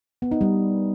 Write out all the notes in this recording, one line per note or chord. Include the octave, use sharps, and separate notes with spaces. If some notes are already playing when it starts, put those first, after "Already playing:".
B3
D#4
G3